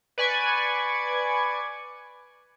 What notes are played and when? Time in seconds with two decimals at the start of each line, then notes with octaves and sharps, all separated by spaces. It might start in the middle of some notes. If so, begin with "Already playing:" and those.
0.18 B4 D5 G#5 C#6 G#6